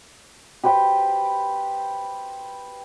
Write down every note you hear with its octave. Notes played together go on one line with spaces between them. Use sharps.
G4 B4 C5 G5